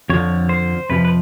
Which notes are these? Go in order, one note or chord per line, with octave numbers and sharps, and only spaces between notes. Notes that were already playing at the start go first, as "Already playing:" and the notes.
F2 D3 F3 C#5
C5
F2 C3 F3 B4
B4